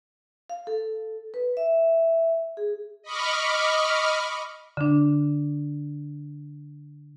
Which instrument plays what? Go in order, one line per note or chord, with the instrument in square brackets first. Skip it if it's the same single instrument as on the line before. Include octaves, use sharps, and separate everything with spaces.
[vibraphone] F5
A4
B4
E5
G#4
[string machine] D#5 B5 C#6 D6 F6
[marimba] D3 D4